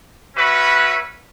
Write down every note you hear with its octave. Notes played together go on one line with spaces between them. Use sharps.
C#4 F#4 B4 E5